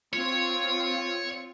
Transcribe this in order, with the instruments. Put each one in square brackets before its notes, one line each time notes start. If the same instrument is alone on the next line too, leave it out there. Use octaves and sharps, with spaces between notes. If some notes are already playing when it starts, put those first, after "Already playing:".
[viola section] C4 F4 [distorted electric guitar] C#5